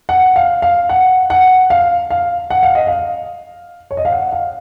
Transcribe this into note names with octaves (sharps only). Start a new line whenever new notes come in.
F#5
F5
F5
F#5
F#5
F5
F5
F#5
F5
D#5
F5
C#5
D#5
F5
F#5
F5